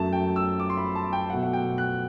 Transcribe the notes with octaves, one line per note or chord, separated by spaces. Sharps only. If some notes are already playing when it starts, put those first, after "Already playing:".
Already playing: F#2 F#3 A3 A5
G5
E6
D6
C6
B5
A5
G5
B2 F#3 A3 F#5
F#5
G5
F#6